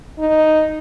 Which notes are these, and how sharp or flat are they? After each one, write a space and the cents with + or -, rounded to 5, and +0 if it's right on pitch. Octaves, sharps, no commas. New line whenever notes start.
D#4 +0